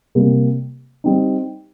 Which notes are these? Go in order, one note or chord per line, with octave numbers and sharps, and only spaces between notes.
C3 G3 A#3
G3 C4 D#4